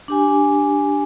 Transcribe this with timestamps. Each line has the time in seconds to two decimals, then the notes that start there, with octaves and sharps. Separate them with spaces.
0.08 D4 G4 G#5